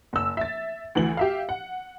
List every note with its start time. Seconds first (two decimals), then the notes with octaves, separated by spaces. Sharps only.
0.13 F#1 E6
0.37 E5 A6
0.95 D2 E3 F#7
1.17 G4 E5 F5
1.49 F#5